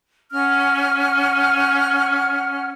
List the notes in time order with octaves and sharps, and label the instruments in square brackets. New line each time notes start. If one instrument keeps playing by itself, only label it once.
[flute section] C#4 F#5 F6